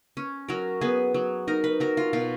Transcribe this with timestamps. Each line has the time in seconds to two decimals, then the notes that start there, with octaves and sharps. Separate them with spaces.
0.17 C#4
0.48 F#3 A#4
0.81 B3 G#4
1.14 F#3
1.48 D#4 A#4
1.64 B4
1.80 F#3 A#4
1.97 F4
2.13 B2 F4